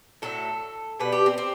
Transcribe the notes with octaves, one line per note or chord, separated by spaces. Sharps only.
A2 F#3 A3 A4
B2 G3 B4
G4
C4
C4